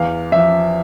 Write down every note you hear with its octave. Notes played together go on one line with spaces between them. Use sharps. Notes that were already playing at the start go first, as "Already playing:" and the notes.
Already playing: E2 E3 F5
F3 E5